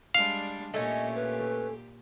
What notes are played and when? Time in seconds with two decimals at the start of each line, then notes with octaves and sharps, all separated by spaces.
0.14 G3 G#3 D4 F5
0.74 A#2 A3 C#4 G4 D#5
1.15 B4